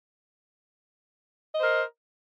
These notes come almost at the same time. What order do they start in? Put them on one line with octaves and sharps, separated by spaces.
D#5 C5 A#4